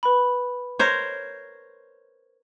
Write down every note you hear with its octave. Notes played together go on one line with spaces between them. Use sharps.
B4 B5
A#4 C5 C#5